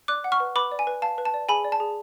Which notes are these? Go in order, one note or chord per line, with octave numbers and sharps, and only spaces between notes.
D5 D6 F#6
F#5
C#6 F6
B4
B4 B5 D6
D5
G#5
B4
F5 A5
B4
A5
D5
G#4 G#5 B5
D5
A5
G#4